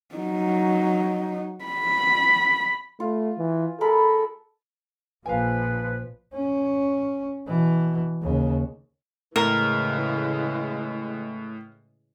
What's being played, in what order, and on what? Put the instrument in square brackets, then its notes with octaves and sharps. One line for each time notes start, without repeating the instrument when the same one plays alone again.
[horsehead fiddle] F#3 D#4
B5
[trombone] A3 [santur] F4
[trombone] E3
[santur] G#3 A#4 B5 [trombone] A4
[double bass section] A#1 F3 [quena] B4 [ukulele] F5 G#5
[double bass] C#4
B2 E3
D#2 C#3
[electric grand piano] A2 [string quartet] C#3 E3 G#3 [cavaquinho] A#4